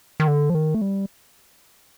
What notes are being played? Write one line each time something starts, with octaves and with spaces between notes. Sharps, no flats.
D#3
D3
F3
D#3
A3
G3